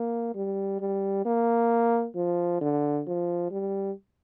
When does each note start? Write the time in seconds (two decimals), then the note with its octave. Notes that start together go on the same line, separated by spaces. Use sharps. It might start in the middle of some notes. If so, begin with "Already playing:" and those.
Already playing: A#3
0.35 G3
0.80 G3
1.25 A#3
2.15 F3
2.61 D3
3.07 F3
3.51 G3